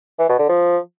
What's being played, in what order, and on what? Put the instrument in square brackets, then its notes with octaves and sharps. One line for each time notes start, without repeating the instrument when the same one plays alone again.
[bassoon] E3
B2
D3
F3